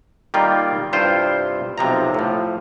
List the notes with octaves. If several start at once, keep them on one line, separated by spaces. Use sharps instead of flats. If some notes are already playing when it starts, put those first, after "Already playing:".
D#3 G3 A#3 F4 G5
G2 C3 E4 F4 C5 G5
B1 C3 F3 A#5
A2 F3